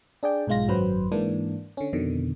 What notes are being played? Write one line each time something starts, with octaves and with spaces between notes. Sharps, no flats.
D4 G#4 D5 G5
B1 G#2 G#3 F4 A#6
G#1 F#2 F#3 B4 C5
G#2 E3 A#3 D4
D3 C#4
F2 B2 D3 D#3